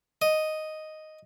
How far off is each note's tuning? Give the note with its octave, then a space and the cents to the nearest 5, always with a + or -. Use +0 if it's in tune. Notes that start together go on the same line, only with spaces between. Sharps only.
D#5 +0